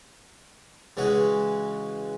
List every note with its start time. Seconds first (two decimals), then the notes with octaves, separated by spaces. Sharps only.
0.97 C#3 E3 G#3 F#4